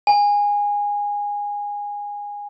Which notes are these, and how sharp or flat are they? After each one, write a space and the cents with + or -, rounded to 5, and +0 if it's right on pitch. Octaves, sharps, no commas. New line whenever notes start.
G#5 -20